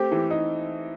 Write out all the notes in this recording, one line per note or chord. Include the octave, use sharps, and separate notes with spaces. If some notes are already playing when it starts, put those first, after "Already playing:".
Already playing: A3 C4 G4
E3
D#4